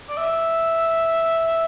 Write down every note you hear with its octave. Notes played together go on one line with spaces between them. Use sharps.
D5
E5